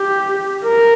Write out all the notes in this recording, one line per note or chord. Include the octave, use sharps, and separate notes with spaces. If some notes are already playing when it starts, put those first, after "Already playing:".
Already playing: G4
A#4